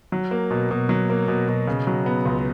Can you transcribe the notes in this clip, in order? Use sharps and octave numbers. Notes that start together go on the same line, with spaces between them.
F#3
A#3
B2
B2
F#3
A#3
B2
B2
C#3
F#3
B3
C#2